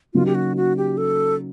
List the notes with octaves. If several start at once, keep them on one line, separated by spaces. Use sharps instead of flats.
C#3 F#3 A#3 D#4 F4
G4
F#4
F#4
G4
A4